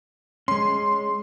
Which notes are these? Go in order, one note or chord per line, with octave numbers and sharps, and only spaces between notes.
G#3 C#4 C6